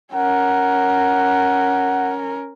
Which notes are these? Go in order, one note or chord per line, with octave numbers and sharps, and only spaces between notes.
C#4 A#4 F#5